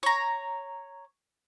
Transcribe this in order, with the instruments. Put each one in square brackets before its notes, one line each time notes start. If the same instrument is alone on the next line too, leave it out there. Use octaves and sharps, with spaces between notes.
[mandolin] C#5 A#5